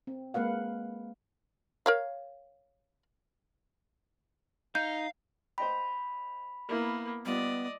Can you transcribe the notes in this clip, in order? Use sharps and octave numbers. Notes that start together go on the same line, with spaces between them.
C4
G#3 A#3 B4 F5 F#5
A#4 C#5 F5
D#4 F5 G6
C5 D#5 G5 B5
A#3 B3 E4 A#4
G3 B3 F4 D5 D#5